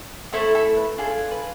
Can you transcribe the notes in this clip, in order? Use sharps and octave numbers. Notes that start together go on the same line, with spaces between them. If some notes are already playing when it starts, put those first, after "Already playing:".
A3 E4 A4 C5
A4
B4
D4 F4 G#4 A4
B4